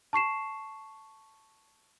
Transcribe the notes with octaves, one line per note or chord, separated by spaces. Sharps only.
A5 C#6 C7 E7